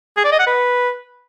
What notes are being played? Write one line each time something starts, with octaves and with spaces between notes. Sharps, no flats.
G#4
D5
D#5
F#5
B4